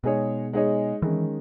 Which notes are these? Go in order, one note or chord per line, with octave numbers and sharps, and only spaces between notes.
B2 G#3 D#4 G#4 C#5
G#3 D#4 G#4 C#5
D#3 E3 G#3 C#4